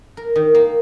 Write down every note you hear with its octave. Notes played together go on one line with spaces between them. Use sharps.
A#4
D#3
A#3